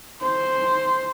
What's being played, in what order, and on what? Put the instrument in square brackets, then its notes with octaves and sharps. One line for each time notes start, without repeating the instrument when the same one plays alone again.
[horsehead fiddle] C5